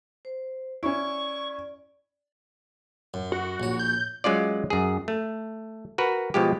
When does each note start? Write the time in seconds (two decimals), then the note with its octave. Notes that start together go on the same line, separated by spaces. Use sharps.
0.25 C5
0.83 C#4 E4 D5 C#6
3.14 F#2
3.32 F#4
3.60 A#1 C#5
3.79 G6
4.24 F#3 G#3 C#4 F4 D5
4.70 F#2 G#4
5.08 A3
5.98 F#4 A#4 B4
6.34 B2 F3 G#3 G4